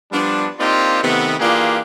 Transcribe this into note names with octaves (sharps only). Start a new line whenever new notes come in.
F3 G3 B3 D4
A#3 C4 D4 D#4 F4 G4
C3 D#3 A3 B3
E3 A#3 D4 F4 G4 G#4